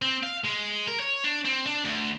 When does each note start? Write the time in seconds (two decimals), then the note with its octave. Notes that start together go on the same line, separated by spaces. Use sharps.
0.02 C4
0.23 F5
0.44 G#3
0.88 A#4
1.00 C#5
1.24 D4
1.45 C4
1.66 D4
1.85 D2